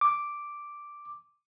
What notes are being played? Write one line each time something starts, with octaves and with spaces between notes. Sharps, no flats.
D6